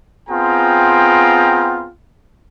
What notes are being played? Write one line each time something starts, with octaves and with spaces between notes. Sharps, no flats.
B3 C4 F4 G#4 G5 A#5